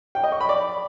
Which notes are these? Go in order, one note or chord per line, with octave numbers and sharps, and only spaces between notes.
G5
D#5
C#6
B5
D5